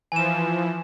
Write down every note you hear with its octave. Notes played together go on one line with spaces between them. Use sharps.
E3 F3 G#5 E7